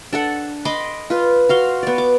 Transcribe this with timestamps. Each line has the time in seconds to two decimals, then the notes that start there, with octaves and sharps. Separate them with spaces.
0.13 D4 A4 F#5
0.65 D#5 B5 C6 D6
1.10 F4 B4
1.49 F#4 F5 C6
1.83 B3 D5
1.98 D6